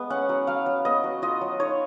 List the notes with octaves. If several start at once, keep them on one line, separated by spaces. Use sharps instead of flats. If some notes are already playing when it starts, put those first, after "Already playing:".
Already playing: G#3 B3
C#4 F#5
F#3
F#3 F5
F#3
B3 D#5
F#3
F4 D#5
F#3
D#4 C#5